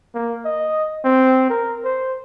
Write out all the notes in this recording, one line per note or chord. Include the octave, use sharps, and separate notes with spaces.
A#3
D#5
C4
A#4
C5